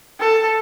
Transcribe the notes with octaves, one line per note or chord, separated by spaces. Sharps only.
A4